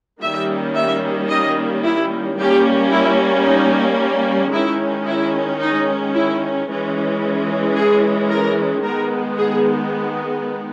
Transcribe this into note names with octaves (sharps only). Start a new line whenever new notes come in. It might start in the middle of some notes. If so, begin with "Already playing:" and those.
D#3 G3 A#3 C#4 E5
E5
D#5
E4
G3 A#3 C#4 G4
E4
D#4
D#3 G#3 C#4 E4
E4
D#4
E4
E3 G#3 C#4
G#4
A#4
D#3 G#3 B3 A#4
G#4